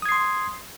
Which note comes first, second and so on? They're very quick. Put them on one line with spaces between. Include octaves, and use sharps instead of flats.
D#6 G#6 C7 C6